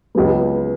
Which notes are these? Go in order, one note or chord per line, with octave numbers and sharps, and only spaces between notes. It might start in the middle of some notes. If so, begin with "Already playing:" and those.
C#2 C#3 F#3 B3